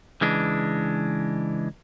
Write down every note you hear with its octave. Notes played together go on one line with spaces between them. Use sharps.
C#3 E3 G#3 D4